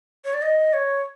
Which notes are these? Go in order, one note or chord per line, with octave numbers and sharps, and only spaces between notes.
C#5
D5
D#5
C#5